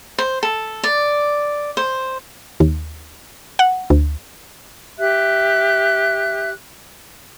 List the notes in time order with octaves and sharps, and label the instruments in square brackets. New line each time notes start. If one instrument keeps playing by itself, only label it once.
[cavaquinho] C5
A4
D5
C5
[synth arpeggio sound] D#2
F#5
D2
[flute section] G4 E5 F#6